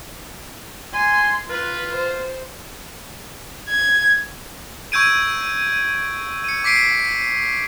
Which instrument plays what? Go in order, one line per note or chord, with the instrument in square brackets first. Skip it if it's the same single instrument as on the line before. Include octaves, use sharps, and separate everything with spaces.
[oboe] G#5 [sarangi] C6
[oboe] F4 [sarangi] B4
[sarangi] C5
[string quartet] G#6
[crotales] C#6 E6 G6 G#6 D7 D#7
C#7 D#7
D6 B6 C7 D7 D#7